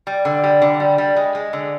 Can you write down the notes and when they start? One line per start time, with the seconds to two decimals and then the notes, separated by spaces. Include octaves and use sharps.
0.07 G3
0.25 D3
0.43 G3
0.62 D3
0.80 G3
0.98 G3
1.16 G#3
1.35 G#3
1.53 D3